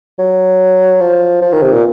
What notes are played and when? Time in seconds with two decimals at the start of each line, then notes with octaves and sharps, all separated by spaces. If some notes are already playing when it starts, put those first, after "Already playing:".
0.19 F#3
1.01 F3
1.42 F3
1.52 D#3
1.62 C3
1.73 A#2